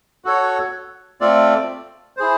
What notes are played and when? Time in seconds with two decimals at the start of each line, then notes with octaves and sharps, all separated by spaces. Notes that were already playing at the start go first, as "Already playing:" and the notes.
0.25 F#4 A4 C#5
1.21 A3 C4 F4 A4 D5
2.17 E4 G#4 C5